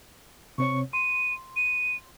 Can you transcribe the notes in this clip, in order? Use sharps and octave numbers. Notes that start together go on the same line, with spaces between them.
C3 C4 C#5 C#6
C6 D#7
D#7